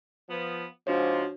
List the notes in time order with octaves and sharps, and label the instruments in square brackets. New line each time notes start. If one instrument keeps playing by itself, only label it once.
[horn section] F3 B3
[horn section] G#2 F3 [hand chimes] D4 F#4 C#5